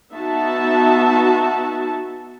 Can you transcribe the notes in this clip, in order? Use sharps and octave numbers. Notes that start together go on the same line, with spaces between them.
B3 D#4 F#4 E5 A5